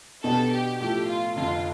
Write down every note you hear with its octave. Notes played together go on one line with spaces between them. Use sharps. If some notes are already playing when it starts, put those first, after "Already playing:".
B2 B3 D4 G4 A4
G4
A2 F3 A3 G4
F4
F1 F2 D3 F3 F4